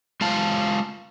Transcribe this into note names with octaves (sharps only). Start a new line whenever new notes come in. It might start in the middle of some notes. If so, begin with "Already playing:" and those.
G#3 F4 F5 A5